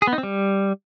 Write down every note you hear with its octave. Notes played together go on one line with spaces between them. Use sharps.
G#4
B3
D#4
C4
G3